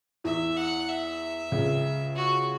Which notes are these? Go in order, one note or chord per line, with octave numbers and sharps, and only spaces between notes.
E2 E3 E5
F#5
E5
C#2 C#3
F#4